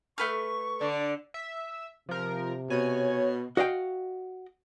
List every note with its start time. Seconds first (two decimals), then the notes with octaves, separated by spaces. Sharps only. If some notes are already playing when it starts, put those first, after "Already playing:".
0.18 A3 B4 C#6 F6
0.81 D3 D5
1.34 E5
2.09 C3 F3 A#4
2.70 B2 C#5 G#5
3.57 F#4 D#5 F5 G5